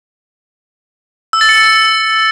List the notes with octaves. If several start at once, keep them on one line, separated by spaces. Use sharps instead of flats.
E6
A6
C#7